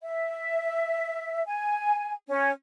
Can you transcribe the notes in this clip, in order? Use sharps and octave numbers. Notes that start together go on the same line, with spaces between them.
E5
G#5
C#4